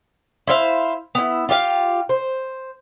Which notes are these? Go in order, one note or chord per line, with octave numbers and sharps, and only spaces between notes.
E4 C5 E5 F5
B3 E4
F4 G4 E5 F5
C5